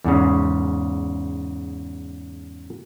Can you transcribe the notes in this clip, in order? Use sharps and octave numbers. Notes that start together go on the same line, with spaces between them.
E2 G#2 C#3